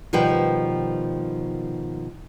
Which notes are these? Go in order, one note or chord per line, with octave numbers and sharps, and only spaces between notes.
B2 D#3 F3 G3 B4 G5